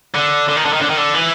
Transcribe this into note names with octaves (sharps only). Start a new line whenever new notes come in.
D3
D3
D#3
D3
D#3
D3
D#3
D3
E3